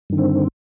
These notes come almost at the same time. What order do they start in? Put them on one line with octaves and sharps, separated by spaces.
G2 D#3 D3 C4